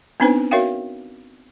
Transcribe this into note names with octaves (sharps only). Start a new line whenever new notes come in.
B3 C4 D4 D#4 B4 C5
F#4 A#4 C#5 E5 F5 G5